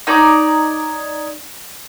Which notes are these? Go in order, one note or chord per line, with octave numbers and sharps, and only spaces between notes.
D#4 C#5 D5